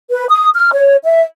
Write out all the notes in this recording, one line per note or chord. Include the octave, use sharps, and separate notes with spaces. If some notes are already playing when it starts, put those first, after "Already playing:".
B4
D#6
F6
C#5
E5